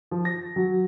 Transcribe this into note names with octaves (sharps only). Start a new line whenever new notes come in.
F3
A#6
F#3